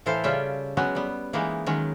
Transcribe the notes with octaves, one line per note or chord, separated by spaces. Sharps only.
A2 E3 E4 A4 C5 F5
C#3 G3 C#4 F4 E5 G5
F#3 G#3 B3 C#4 F#4
G3 B3
E3 G#3 A#3 B3 D#4
D#3 F#3 G#3 C#4